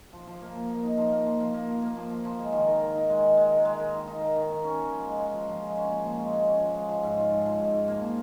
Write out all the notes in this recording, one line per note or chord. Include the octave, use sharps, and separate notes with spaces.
F3
F3
A#3
F3
A#3
D#4
F3
A#3
F3
F3
A#3
F3
A#3
F3
F3
F3
G#3
D#3
A#4
A#4
D#4
G#3
D#3
G#3
A#4
G#3
A#4
D#3
D#4
A#4
D#3
D#3
C#4
C#4
F3
G#3
G#3
F3
F3
G#3
C#4
A#2
F3
G#3
G#3
C#4
F3
G#3
F3
G#2
F4
G#2
F3
G#2
G#2
A#3
F3